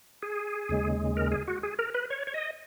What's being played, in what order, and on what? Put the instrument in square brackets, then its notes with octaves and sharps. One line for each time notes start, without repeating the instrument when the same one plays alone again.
[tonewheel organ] G#4
D#2 C#3 G#3
A#4
G#4
F#4
G#4
A#4
B4
C#5
C#5
D#5